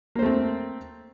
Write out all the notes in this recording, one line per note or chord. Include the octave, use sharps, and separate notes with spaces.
A3 A#3 C4 C5